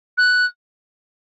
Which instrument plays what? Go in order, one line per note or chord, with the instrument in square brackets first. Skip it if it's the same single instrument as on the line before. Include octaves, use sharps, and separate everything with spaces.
[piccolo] F#6